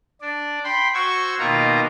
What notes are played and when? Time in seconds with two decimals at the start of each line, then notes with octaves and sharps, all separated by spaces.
0.21 D4 D5
0.64 G5 B5 C6
0.94 F#4 C5 C#6 E6 G#6
1.39 B2 D#3 A#3 F4 A#5